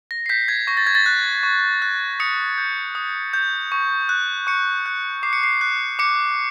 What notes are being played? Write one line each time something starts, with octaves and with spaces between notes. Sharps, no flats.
A#6
C7
G6 B6
G#6
C#6 A#6
A6
G#6
A6
F#6
C#6
F#6
D#6 C#7
G6
D#6
G6
C#6
F#6
C#6 C#7
F#6
D6 C7
C#7
C7
F#6
D6 C#7